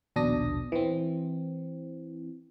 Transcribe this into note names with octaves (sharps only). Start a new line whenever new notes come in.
A#1 D#2 B2 D4 D#6 A#6
E3 C4